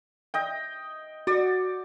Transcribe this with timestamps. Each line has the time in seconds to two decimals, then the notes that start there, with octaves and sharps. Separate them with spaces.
0.34 D#5 G5
1.27 F#4 D5